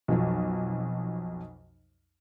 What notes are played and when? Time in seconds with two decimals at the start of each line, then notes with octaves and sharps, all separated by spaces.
0.08 B1 F2 F#3